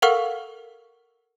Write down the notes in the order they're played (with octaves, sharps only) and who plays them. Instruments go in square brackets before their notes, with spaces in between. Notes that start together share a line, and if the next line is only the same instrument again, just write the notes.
[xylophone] A4 A#4 F5 F#5 C#6 F6